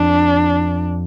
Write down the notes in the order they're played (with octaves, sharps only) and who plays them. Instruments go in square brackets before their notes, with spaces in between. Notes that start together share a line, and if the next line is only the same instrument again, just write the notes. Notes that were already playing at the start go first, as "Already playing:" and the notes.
Already playing: [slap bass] F2 [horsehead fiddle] D4